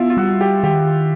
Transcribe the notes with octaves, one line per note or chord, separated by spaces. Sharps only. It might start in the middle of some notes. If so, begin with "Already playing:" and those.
Already playing: B3 E4 F4
F4
G3 F#4
G4
D#3 G4